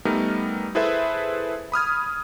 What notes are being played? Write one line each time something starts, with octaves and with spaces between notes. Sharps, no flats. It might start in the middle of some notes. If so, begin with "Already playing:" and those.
G3 A3 B3 D#4 A#4
E4 G#4 A4 B4 C5 E5
B5 D#6 F6 G#6